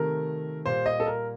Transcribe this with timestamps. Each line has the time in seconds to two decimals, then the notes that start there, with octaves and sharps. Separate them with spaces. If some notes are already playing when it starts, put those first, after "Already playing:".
Already playing: C3 D#3 A3 A#4
0.66 A#2 G3 C5
0.86 D#5
1.00 A4
1.07 A#4